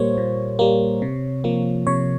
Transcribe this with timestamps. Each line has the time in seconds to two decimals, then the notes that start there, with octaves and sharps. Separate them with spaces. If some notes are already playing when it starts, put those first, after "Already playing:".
Already playing: A#2 G3 A#3 C5 C#5
0.17 A#2
0.59 G3 A#3
1.02 C3
1.44 F3 A#3
1.87 C3 C#5